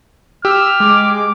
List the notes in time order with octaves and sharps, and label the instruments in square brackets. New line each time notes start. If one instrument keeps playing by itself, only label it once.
[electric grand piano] G4 [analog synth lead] E6 [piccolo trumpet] F6
[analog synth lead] G#3 [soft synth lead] D6